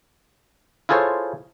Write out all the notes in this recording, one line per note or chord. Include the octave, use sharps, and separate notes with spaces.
E4 F4 G#4 A4 C5 C#5